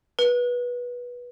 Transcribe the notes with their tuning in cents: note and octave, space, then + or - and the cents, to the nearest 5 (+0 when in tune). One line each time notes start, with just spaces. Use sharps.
B4 -20